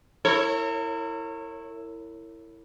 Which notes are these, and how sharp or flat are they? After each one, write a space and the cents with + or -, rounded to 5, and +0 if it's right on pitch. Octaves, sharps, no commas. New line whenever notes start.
E4 +0 A#4 -40 C#5 -25